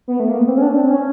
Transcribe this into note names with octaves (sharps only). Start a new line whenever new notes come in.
B3
A3
A#3
B3
C4
C#4
D4
C4
C#4